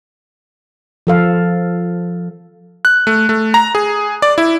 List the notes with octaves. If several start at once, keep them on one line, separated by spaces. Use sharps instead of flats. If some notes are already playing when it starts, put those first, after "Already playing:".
F3 A4 F5
F#6
A3
A3
A#5
G#4
D5
E4